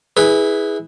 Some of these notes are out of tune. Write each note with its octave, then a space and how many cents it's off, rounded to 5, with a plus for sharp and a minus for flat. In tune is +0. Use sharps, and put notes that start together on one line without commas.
E4 -25 G#4 +0 B4 +0